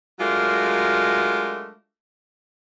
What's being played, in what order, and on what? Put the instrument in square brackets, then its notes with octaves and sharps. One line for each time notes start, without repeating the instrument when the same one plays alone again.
[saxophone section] F#3 G#3 A3 D4 F4 A#4